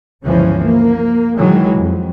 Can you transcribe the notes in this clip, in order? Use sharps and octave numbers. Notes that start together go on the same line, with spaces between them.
G1 C#2 E3 F3 C#4
A#3
D#3 E3 F#3 G#3
F2